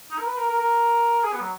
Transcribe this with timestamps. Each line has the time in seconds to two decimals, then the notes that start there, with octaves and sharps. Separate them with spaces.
0.11 D#4
0.19 A#4
0.27 B4
0.37 A#4
0.48 A#4
0.59 A#4
1.24 G#4
1.33 B3
1.41 F#3